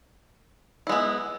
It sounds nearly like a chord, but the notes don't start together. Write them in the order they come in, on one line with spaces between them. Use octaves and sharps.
E4 G#3 B3